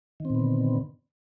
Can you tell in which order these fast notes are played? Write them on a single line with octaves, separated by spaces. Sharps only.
D#3 C4 A#2 B3 D3